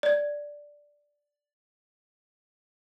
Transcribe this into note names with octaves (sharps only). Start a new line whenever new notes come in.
D5 G#6